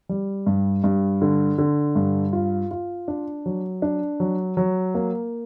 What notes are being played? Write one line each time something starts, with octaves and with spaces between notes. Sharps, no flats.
G3
G2
G2
D3
D3
G2
F4
F4
D4
F#3
D4
F#3
F#3
A#3